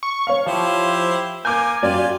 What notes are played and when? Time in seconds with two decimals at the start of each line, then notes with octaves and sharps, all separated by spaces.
0.03 C#6
0.27 C#5 F5
0.46 F3 E4 G4 C5
1.45 A#3 G#5 D6 F6 G6
1.83 F#2 F4 G4 D5